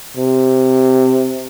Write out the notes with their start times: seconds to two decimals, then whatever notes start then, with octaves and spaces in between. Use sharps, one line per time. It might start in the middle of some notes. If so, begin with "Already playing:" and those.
0.17 C3